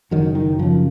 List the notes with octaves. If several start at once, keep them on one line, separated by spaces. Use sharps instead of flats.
F#1 D#3 F#3
D#3
F#2 C#3 F3